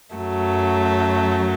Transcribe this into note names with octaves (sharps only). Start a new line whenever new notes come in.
F#2 F#3 A3